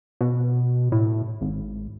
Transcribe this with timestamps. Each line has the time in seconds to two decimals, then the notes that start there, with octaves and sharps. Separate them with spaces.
0.21 B2
0.92 A2
1.41 G#1